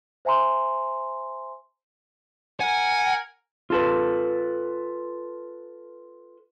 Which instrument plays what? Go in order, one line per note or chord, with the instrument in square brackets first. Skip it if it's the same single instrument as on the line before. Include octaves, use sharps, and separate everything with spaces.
[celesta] C5 E5 G#5 A#5 C6
[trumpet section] A#4 G#5 [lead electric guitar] F#5
[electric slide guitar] F4 A4 B4